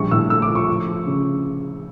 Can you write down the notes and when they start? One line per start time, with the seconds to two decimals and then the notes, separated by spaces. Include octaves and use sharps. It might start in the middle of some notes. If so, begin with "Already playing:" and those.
Already playing: A#1 G3 C#6
0.11 A2 E6
0.30 A3 E6
0.42 D6
0.49 F3
0.55 C#6
0.68 F3
0.87 F3
1.07 C#3